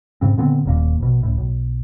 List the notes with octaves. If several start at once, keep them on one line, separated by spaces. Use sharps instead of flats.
G#2 C#3 C4
A#2 D3 B3 C4
D#1 D#2 A#2 A#3
A#1 B2
C#2 A2
B1